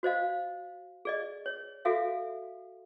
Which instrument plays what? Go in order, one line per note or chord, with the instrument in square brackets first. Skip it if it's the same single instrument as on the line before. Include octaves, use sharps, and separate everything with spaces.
[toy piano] F#4 C5 D#5 F5
G#4 D5 D#5
C#5
F#4 A4 E5 F5